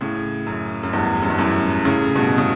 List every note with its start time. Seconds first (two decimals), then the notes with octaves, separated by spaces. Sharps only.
0.01 A2 C#3
0.46 F#2
0.83 F#2
0.93 E2 G2
1.22 F#2
1.30 G2
1.38 F#2 A2
1.85 A2 C#3
2.15 G2 B2
2.38 C#3